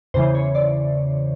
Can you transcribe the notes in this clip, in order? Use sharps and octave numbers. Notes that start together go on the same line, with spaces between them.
E2 C#3 E3 C5
C#5
D5